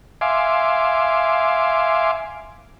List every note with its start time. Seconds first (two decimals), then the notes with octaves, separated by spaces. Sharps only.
0.21 E5 F5 G#5 C6 D6